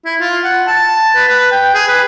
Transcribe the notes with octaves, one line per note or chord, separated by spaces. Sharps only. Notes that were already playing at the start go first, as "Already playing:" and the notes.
E4
F4
F#5
A5
B4
B4
G5
G#4
B4